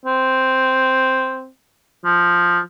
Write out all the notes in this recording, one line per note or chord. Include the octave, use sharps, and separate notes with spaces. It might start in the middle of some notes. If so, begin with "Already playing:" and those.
C4
F3